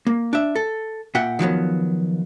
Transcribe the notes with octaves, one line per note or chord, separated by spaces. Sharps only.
A#3
D4 E5
A4
A#2 E5 F#5 G5
D#3 F3 F#3 B3